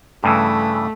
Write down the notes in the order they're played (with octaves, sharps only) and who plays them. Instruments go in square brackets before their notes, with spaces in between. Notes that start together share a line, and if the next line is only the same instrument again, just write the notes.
[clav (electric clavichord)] G2 C#3 E3 [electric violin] A3